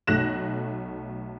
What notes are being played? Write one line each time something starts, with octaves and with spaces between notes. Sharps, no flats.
B1 A3 F#6 A#6 E7